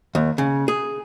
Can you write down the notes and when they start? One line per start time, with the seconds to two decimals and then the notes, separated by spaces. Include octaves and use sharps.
0.15 D#2
0.38 C#3
0.68 G#4